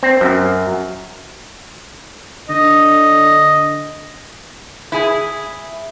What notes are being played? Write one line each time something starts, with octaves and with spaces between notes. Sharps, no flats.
C4
F#2
D3 D#5
E4 G#4